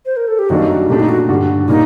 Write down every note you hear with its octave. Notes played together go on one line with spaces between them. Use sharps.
C5
A#4
A4
G4
F#2 D#3 G3 A#3 D4 F#4
A#2 A3 D4 G4
D#4
F#4
G2 D3 G3 D4 F#4
A#2 G3 A#3 D#4